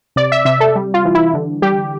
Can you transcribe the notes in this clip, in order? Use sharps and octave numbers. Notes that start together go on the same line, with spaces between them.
C3 D5
E5
C3 E5
A4
G3
F4
E3
E4
D3
G3 G4